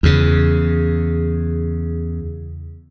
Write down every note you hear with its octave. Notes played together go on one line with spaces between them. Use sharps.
E2 C#3